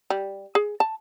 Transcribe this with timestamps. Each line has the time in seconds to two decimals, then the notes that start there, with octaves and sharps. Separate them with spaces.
0.10 G3
0.55 G#4
0.80 A5